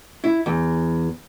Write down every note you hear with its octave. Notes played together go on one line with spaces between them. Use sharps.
E4
E2